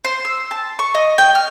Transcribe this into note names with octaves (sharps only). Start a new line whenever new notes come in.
C5
E6
A5
C#6
D#5
G5
F6